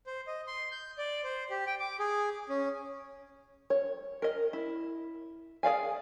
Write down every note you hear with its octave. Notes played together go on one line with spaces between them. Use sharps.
C5
D#5
C6
G6
D5
C5
G4
G5
D6
G#4
C#4
C#5
A#4 D#5
E4
G#4 D5 F5 G#5